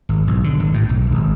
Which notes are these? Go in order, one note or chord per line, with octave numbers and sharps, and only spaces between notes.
G#1
B1
D3
G#1
A2
B1
G#1